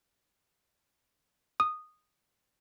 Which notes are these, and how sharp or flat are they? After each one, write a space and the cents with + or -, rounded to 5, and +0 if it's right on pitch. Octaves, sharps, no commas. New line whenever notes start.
D#6 -10